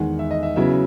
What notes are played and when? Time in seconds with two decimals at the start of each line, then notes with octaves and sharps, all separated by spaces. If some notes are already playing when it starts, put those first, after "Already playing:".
Already playing: E2 D#3 G#3 F#5
0.19 E5
0.31 D#5
0.43 E5
0.56 C#3 F#3 B3 E4 E5